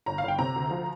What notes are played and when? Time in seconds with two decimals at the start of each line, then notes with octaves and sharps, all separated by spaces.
0.06 G1 A#5
0.18 F5
0.23 G1 G5
0.39 C3 A#5
0.56 D2
0.71 F3